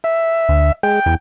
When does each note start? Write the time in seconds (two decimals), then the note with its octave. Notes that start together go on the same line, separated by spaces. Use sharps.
0.04 E5
0.49 D2
0.83 G#3 G5
1.06 E2